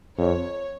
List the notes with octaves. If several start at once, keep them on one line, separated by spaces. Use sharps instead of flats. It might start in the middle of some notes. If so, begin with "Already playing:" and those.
F2 C#5